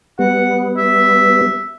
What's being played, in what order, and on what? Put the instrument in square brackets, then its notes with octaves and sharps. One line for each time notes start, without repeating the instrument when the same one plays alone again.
[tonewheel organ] G3 B3 [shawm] F#5
[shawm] E5